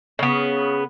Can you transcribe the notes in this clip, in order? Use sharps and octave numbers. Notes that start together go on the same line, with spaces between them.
C#3 B3